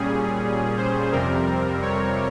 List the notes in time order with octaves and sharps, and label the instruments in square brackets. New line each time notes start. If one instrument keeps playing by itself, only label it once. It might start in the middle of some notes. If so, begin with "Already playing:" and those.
Already playing: [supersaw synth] A#2 G3 C#4 G#4
C5
F2 C3 G3 C4 A#4
C#5